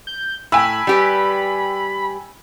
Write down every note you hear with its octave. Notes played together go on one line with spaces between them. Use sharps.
G6
A2 G5 G#5 B5 E6
G3 G4 B4